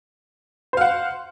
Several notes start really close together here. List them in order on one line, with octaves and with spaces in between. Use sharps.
C5 F5 F#5